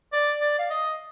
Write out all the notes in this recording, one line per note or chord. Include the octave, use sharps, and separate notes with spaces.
D5
D5
F5
D#5